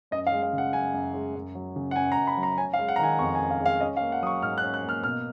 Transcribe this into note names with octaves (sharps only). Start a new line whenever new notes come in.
F#2 D#5
F5
G#3
F5
C#3
F#5
F#2 G#5
F#2
G#3
F#2
F#3
C#3
F#5
F#2 G#5
A#5
F#2
B5
F#3
A#5
C#4 G#5
F5
G#3
F#5
A#5
D#3 G#5
F2 C#6
G#5
C#4
F5
G#3 F5
C#4 D#5
F5
A#3
F#5
F#3 D#6
C#6
G#2 F6
F#6
C#4
F#6
A#3 F6
B2 F6